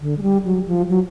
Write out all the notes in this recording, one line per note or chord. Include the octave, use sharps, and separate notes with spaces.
D3
G#3
G3
F#3
F3
F#3